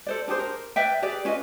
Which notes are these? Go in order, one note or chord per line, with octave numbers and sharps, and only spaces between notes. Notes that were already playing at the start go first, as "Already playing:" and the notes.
A4 C5 D5
D4 G4 G#4 C5
A#4
B4 D5 E5 G5
G4 G#4 B4 D5
C#4 F4 B4 D#5